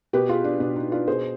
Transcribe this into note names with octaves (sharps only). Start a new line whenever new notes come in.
B2 G4 B4
F4 G#4
D4
B2 D4
D#4
D4 F4
B2 G#4 C5